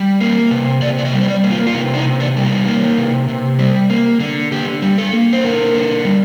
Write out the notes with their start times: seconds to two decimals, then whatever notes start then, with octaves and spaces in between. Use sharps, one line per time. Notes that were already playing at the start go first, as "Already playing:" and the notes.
Already playing: G3
0.20 A#3
0.51 C3
0.82 C3 D5
0.99 D5
1.05 D#5
1.13 G3
1.21 C5
1.28 D5
1.44 A#3
1.51 F4
1.67 F4
1.74 C3 D#4
1.94 D4
1.97 D#4
2.05 C3
2.20 D4
2.36 G3
2.44 D#4
2.66 A#3
2.97 C3
3.28 C3
3.59 G3
3.90 A#3
4.20 D3
4.52 D3 G4
4.82 G3
4.98 A4
5.13 A#3
5.33 C5
5.44 D3 A#4
5.75 D3
6.05 G3